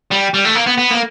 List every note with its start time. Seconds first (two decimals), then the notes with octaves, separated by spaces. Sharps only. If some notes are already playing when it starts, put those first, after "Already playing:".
0.11 G3
0.34 G3
0.45 A3
0.55 A#3
0.67 B3
0.78 B3
0.91 A#3